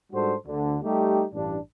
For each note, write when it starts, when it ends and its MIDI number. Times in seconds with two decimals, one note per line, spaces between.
0.12 0.34 44
0.12 0.34 55
0.12 0.34 62
0.12 0.34 66
0.12 0.34 69
0.12 0.34 72
0.46 0.77 38
0.46 0.77 50
0.82 1.25 55
0.82 1.25 57
0.82 1.25 63
0.82 1.25 67
1.33 1.57 33
1.33 1.57 43
1.33 1.57 62